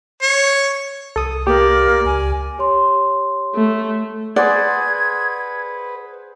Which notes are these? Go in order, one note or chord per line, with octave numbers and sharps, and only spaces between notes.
C#5
C2 A4 D#6
A#3 G4 D5
C#2 G#5
G4 C#5 C6
A3
G#4 B4 C5 D5 F#5 G#6